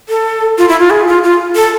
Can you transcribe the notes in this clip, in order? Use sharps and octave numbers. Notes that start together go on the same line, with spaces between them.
A4
F4
E4
F4
G#4
F4
F4
A4